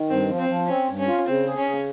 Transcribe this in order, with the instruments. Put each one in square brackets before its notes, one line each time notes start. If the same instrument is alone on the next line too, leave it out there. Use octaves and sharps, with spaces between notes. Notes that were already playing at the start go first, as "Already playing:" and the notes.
Already playing: [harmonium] D#3
[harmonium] G2 [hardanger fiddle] C4
[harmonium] F3
[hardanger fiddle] C4
[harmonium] F3
[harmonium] C4 [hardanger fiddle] C#4
[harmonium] G2
[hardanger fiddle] C#4
[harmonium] F4
[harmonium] C#3 [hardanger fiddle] C4
[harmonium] G#4
[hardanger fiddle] C#4
[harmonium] C#3